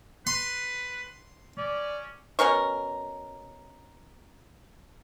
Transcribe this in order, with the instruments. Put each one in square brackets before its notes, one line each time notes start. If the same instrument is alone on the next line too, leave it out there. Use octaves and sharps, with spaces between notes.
[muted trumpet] B4 [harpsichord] C6
[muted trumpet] C#4 [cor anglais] D5
[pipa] B2 C#4 A#4 C#6